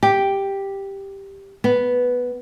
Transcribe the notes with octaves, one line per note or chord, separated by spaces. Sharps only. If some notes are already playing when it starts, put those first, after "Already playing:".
G4
B3